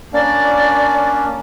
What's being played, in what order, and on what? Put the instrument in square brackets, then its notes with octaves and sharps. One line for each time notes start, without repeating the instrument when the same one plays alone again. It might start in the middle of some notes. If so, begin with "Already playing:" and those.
[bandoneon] A#3 C#4 D4 [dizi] D5